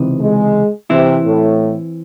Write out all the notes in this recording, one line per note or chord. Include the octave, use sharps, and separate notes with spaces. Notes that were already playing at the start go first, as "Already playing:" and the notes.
Already playing: C#2 C3 E3 C4 D#4
G#3
C3 E3 C4 E4
A2